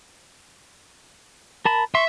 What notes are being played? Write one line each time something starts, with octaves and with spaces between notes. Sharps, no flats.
A#4 A5 B5
E5 C6 C#6